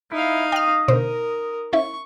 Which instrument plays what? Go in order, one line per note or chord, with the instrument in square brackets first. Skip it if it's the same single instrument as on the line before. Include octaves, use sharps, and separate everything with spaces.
[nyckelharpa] D#4 F5 [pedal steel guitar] E4
[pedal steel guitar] D#5 [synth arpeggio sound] G5 F6
[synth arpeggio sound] B2 D3 C5 [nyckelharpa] A#4
[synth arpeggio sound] C#4 E4 E5 [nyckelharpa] C#6